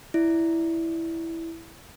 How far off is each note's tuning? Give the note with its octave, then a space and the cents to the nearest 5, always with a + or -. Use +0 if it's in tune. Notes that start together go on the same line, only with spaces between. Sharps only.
E4 +0 D5 +0